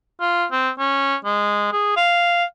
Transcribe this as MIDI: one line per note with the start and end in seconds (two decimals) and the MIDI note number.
0.20 0.45 65
0.52 0.70 60
0.79 1.16 61
1.25 1.71 56
1.72 1.95 68
1.97 2.44 77